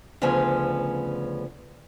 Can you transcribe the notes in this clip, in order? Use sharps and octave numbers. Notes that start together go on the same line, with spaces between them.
D2 C#3 F3 B3 C#4 G#5